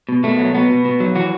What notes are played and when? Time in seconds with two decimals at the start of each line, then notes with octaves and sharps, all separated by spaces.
0.09 B2
0.24 B2 A3
0.39 F#3
0.54 B2 B3
0.69 B2
0.85 B2
1.00 F#3
1.15 E3 F#4